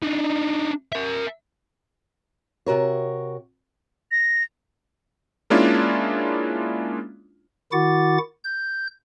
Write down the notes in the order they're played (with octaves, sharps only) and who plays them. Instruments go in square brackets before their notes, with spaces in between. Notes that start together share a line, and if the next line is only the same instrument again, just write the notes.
[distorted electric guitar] D4 D#4
A#4 E5
[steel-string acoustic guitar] C3 F#4 A#4 C#5
[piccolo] A#6
[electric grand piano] G#3 A#3 C#4 D4 E4 F4
[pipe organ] D#3 E4 F#4 F#5 D6 A6
G6